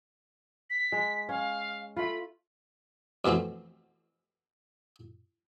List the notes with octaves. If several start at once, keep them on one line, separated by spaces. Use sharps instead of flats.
B6
G#3
C#4 F5
A3 F4 B5
F2 B2 E3 A3 C4